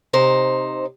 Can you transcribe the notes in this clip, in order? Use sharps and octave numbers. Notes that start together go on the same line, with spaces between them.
C3 D#4 C5